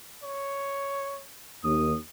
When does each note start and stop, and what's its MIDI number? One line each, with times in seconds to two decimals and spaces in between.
0.23 1.23 73
1.64 1.93 39
1.64 1.95 87